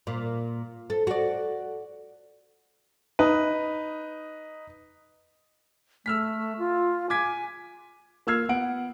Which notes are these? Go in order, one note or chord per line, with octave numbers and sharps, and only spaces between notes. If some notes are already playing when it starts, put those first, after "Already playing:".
A#2
A4
F#4 D5
D#4 B4
A3 E6 F6 B6
F4
G#5 D6 G#6 B6
A#3 F4 E6 F6 G#6 C7
B3 F#5 D7